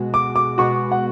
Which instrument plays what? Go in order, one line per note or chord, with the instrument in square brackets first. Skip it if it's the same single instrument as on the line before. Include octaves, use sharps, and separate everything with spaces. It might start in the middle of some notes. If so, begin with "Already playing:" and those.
Already playing: [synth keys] B2 G#3 F#4
[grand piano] D6
D6
[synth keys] B2 G#3 B3 F#4 [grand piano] C#6
[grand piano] F#5